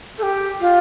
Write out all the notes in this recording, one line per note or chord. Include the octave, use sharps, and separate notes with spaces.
A4
G4
F4